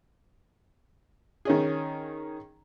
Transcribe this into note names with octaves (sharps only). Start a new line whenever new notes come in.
D#3 C#4 G#4